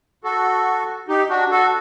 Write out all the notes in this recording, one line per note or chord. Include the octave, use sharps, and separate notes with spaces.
F#4 A4
D#4 G4
D4 F#4
F#4 A4